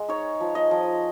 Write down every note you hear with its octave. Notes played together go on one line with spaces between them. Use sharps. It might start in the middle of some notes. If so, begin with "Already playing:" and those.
Already playing: G#3
D#4 C#5
F3
D#5
F3